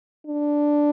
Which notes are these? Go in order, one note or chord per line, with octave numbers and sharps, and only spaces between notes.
D4